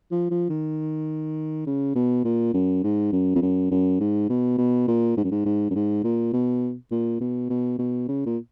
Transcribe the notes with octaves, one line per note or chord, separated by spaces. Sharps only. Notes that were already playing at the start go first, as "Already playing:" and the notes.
F3
F3
D#3
C#3
B2
A#2
F#2
G#2
F#2
F2
F#2
F#2
G#2
B2
B2
A#2
G#2
F#2
G#2
G#2
F#2
G#2
A#2
B2
A#2
B2
B2
B2
C#3
A#2